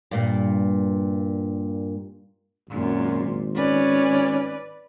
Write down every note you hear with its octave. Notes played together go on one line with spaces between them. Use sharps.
G2 A#2
G#1 F#2 A#2
C#4 B4 D5